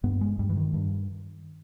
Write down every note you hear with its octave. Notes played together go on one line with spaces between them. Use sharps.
G2 B3
G#3
G2 G3
E3
D#3
G2